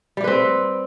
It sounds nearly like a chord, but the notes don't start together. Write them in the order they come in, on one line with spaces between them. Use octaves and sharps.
G3 G4 B4 C4